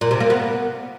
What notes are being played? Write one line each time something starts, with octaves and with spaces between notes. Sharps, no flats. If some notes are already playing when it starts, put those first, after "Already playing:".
A#2
C3
A#3
B3